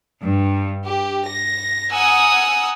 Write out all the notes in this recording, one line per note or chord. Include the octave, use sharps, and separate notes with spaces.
G2
G4
A#6
F#5 G#5 A#5 D#6 E6